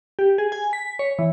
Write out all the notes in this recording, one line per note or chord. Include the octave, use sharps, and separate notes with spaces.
G4
G#4
G#5
B6
C#5
E3